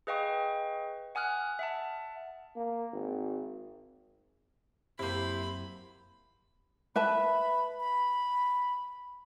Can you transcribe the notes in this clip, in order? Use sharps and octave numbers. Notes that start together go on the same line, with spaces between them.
G#4 B4 D#5 F5 G5 C#6
F#5 G#5 D#6 F6 F#6
E5 F#5 A5
A#3
G#1
F#2 C3 A#3 E4 C5 B5
B4 E5 A5 B5
B5